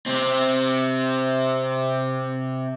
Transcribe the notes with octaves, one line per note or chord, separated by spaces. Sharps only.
C3 C4